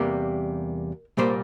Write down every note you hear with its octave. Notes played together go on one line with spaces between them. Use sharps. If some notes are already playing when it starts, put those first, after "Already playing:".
Already playing: E2 C3 G3 A#3 A#4
C2 A#2 G3 A#3 C5